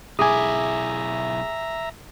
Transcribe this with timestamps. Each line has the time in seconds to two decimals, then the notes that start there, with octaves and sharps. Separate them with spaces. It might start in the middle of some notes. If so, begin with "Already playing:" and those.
0.19 B1 E4 G#4 E5 G#5 A#5 D6 D#6